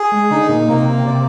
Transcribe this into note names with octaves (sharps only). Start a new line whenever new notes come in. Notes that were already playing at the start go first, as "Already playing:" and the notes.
Already playing: G#4
G#3
D3 D#4
A#2
C3 A#3
C3 D5